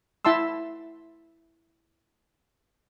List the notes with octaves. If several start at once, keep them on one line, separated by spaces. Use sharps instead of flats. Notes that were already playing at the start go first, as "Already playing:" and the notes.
E4 E5 A5 C6 E6